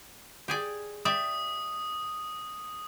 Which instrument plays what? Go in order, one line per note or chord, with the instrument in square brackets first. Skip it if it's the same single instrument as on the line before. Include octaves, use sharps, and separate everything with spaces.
[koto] G4 G#4 D5
[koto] G4 D5 E5 [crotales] D#6